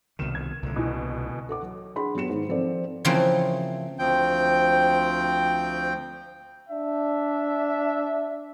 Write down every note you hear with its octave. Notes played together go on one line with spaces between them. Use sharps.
C2 B2 D#3 E7
G#6
C2 A#2 D3
B2 E3
A4 F#5 D6
F#3
D4 G#4 F#5 B5 C6
F#3 B3 G4 C#7 E7
G#2 D#3
F3 C4 A4 D5
C#3 E3 F3 A3 A#3 C4
D2 F3 C4 G5 G6
D4 E5